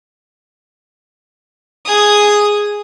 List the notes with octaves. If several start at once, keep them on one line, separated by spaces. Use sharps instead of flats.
G#4 D#6